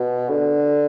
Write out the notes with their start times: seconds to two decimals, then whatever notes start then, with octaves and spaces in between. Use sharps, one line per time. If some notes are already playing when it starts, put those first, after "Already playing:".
Already playing: B2
0.29 D3